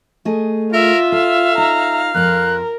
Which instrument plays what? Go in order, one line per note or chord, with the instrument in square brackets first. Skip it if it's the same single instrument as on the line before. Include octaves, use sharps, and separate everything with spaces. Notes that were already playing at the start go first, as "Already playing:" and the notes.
[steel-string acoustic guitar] A3 G#4 D#5
[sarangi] F4 [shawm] A#4 [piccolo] E5
[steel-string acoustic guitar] A4 [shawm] F5
[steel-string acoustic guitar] D#4 [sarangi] A#5
[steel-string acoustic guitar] F2 C4 [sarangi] A#4 [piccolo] F#6